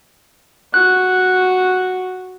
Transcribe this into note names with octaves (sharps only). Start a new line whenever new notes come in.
F#4 F#6